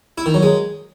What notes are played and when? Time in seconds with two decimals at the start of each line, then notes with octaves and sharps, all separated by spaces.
0.18 E4
0.26 D#3
0.34 F#3
0.43 G#3